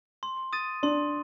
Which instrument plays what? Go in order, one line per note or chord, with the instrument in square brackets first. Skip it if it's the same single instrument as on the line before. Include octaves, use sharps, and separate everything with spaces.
[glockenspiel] C6
D#6 A6 D#7
[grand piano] D4 [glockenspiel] C6